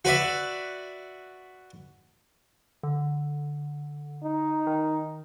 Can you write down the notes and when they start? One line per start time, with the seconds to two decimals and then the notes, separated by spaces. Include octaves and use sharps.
0.05 F#4 B4 D5 E5
2.83 D3
4.23 D#4
4.67 D#3